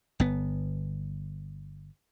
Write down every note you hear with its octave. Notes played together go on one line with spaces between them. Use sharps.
G1 B3